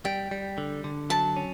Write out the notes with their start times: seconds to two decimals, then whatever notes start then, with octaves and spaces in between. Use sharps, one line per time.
0.05 G3 G5
0.31 G3
0.58 D3
0.84 D3
1.10 F#3 A5
1.37 C#4